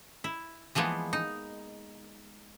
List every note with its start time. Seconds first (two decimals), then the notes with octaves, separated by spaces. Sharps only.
0.24 E4
0.75 E3 F3 G#3 A#3 B3
1.13 D#4